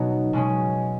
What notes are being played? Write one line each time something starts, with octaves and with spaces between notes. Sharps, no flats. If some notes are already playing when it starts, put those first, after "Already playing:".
Already playing: B2 F#3 B3 C#4 D#4
B2 G#3 C#4